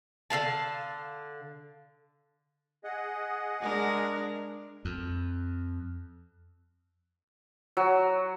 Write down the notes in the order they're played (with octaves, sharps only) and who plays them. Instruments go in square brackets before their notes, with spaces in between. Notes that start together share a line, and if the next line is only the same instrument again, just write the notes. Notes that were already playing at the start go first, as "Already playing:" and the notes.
[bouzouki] D3 A#4 F5 A5
[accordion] G#4 D#5 F#5
[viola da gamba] G#3 D4 A#4
[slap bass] F2
[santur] F#3